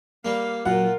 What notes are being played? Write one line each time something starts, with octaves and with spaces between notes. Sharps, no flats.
G3 A#3 F5
A#2 F#3 F4 A#4 F#5